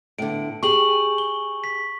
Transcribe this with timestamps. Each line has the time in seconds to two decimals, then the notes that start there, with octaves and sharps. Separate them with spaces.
0.19 A2 D3 D7
0.63 G4 G#4 C#6 F#7
1.18 G7
1.64 B6